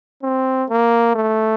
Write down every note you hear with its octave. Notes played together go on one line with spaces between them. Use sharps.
C4
A#3
A3